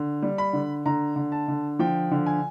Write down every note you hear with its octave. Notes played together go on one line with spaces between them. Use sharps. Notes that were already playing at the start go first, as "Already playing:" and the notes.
Already playing: D3
G3
B5
D3
D3 A#5
D3
A5
D3
F3 G5
D3
G#5